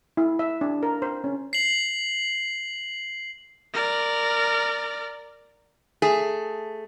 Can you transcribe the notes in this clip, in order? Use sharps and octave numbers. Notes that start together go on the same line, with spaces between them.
E4
E5
D4
A#4
C5
C#4
C7 F#7
A#4 D5
A3 G#4